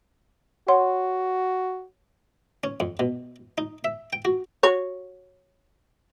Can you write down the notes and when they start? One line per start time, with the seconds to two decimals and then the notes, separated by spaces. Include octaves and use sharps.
0.68 F#4 C#5 F#5 C6
2.64 C#4
2.80 F2
3.00 B2
3.58 D#4
3.84 E5
4.13 G5
4.25 F#4
4.63 F#4 C#5